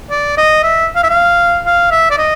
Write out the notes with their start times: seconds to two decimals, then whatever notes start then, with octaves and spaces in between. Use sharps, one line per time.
0.11 D5
0.37 D#5
0.63 E5
0.96 F5
1.04 E5
1.10 F5
1.66 F5
1.91 E5
2.11 D5
2.18 D#5